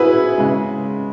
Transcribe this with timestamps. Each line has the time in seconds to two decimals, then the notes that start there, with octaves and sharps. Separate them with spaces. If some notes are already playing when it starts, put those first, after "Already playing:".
Already playing: G#2 E4 F#4 G#4 B4
0.38 C#3 G#3